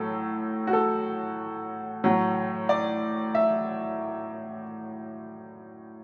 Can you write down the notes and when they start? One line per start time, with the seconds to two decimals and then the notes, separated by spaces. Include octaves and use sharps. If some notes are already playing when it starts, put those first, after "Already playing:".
Already playing: A2 F#3 A4
0.67 F#4
0.73 A4
2.04 A2 F#3
2.69 D5
3.35 E5